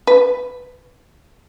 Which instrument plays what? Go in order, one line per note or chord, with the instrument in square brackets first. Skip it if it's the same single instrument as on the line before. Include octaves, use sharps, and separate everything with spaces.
[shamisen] B4